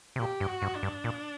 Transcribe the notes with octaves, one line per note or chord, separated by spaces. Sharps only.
C3
A#2 G4
G2
F#4
G2
D4
G2
A#2